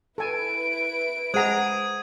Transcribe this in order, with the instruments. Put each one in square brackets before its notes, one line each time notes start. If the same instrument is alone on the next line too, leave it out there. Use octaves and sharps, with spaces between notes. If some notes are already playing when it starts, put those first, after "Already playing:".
[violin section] E4 B4 D7 [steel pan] A4 G#5
[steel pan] G#3 G#4 A#5 [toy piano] C5 F#5 [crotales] D#6 G#6 D#7